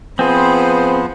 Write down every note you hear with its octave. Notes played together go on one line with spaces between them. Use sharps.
F3 B3 C4 G#4 B4 C5